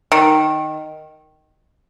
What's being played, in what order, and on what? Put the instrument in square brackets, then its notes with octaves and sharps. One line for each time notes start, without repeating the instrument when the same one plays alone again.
[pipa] D#3